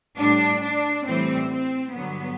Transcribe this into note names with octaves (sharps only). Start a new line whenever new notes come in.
A2 G3 D4
D4
A2 E3 G3 C4
C4
G2 D3 F#3 B3